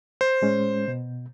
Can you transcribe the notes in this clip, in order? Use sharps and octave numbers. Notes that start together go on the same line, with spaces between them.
C5
A2 G#3 C#4
B2